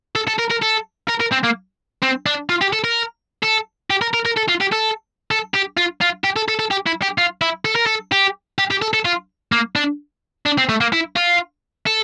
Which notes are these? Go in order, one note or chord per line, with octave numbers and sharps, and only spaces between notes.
A4
A4
A#4
A#4
A4
A#4
A#4
C4
A#3
C4
D4
F4
G4
A4
A#4
A4
G4
A#4
A#4
A#4
A4
F4
G4
A4
A4
G4
F4
F4
G4
A4
A4
A4
G4
E4
G4
F4
E4
A4
A#4
A4
G4
G4
G4
A4
A4
F4
A#3
D4
D4
C4
A3
A#3
E4
F4
A4